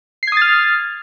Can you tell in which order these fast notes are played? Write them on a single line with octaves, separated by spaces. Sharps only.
C7 G#6 D#6 A6 F6